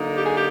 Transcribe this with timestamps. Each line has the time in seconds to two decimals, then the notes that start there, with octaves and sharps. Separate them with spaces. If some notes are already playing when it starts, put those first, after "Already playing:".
Already playing: D3 F#3 A#3 D#4
0.14 G4
0.23 G#4
0.34 G4